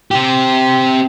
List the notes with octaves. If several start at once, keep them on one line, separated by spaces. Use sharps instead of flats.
C4 G4